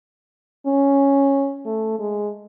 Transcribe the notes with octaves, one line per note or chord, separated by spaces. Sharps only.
C#4
A3
G#3